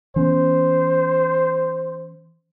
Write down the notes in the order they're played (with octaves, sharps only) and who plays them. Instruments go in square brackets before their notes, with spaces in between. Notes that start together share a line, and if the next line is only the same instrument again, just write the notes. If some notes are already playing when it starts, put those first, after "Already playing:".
[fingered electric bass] E3 B3 C#4 [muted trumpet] C5